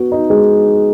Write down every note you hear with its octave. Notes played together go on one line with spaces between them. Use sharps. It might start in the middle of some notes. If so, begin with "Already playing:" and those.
Already playing: B3 F#4
D#4
G#3